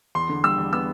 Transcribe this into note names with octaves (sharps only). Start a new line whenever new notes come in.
E2 C6
D3
G3 E6
E2
B3 E6